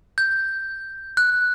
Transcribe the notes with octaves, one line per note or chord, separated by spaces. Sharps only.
G6
F#6